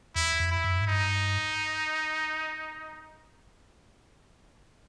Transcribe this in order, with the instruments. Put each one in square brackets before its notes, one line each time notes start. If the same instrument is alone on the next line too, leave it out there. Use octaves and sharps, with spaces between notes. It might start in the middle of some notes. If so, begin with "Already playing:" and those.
[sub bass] E2 [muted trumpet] E4
[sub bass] F2
[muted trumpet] E4
[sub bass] F#2
G#2
[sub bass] G2 [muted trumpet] D#4